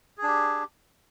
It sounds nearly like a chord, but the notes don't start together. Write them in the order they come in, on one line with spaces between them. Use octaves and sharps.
G#4 D4 G4